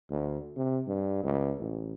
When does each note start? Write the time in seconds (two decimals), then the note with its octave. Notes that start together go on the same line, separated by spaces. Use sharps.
0.10 D2
0.57 C3
0.87 G2
1.23 C#2
1.59 A1